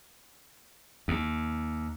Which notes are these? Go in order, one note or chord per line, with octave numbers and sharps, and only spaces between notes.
D#2